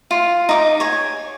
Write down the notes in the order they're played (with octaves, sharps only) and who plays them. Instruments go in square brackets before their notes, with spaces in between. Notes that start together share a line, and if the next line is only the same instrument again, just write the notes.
[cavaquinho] F4
D#4 D6
C#5 G#5